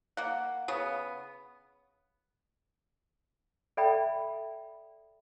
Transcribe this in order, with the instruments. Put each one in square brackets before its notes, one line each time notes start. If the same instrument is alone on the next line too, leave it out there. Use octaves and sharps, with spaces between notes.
[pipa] A#3 F#5
C#3 B3
[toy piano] A4 D5 E5 G5 B5